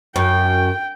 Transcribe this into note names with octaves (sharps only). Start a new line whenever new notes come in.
F#2 G5